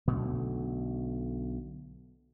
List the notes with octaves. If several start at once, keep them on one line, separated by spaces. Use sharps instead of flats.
B1 B2 D3 A3